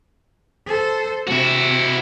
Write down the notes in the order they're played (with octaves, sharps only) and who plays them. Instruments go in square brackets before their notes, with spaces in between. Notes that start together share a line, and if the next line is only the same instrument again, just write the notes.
[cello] A4 C5
[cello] C3 [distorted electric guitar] E4 F#4